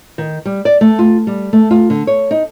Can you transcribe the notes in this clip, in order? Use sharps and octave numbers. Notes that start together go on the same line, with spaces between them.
D#3
G3
D5
A3
F4
G3
A3
F4
D3
C#5
D#4